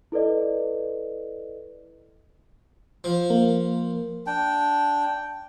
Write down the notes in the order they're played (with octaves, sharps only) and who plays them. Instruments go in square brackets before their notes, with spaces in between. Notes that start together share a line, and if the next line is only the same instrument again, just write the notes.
[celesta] E4 A4 B4 D5 D#5
[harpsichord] F3
[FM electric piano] A#3
[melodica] D4 G5